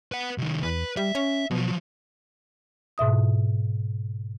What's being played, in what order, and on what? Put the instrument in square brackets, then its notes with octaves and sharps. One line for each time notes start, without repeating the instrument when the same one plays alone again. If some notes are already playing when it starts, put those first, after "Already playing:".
[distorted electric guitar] B4 F#5
C2 D#3
[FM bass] E2 [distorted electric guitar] B4
[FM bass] G3 [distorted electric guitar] E5
[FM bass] C#4
[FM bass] B2 [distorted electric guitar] F3 F#3
[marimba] G#2 B2 E5 D#6